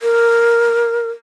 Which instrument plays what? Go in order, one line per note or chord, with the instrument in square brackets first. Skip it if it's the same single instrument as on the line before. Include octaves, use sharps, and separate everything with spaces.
[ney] A#4